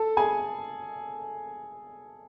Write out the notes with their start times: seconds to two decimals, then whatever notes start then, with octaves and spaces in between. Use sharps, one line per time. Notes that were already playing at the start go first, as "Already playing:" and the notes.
Already playing: A4 A5
0.17 G#4 G#5